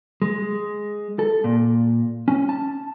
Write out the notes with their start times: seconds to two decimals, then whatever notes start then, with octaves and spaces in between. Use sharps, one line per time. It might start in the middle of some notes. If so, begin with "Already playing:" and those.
0.22 G#3
1.19 A4
1.44 A#2
2.28 C#4
2.49 A5